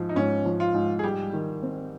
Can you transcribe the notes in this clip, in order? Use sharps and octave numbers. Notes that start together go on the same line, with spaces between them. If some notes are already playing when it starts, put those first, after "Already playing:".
Already playing: G#2 F3
D#4
G#2 C#4
F3
F4
G#2
G#4
G3 G4
D#3
C4